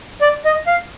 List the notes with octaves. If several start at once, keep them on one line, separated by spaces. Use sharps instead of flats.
D5
D#5
F5